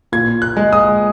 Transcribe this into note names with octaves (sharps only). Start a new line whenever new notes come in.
A#2 G#6
F#6
G#3
D#6